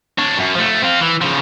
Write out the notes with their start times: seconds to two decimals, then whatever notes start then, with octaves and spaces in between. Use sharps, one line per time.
0.18 D4 C#5
0.38 F#2
0.55 F3 A3
0.83 C4 F4
1.01 E3
1.22 C#3 F3